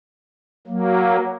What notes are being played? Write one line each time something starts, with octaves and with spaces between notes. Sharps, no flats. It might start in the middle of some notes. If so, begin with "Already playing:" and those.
F#3 A#3